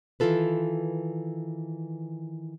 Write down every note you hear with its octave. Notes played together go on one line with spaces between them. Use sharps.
D#3 E3 F#3 F4 A4 B4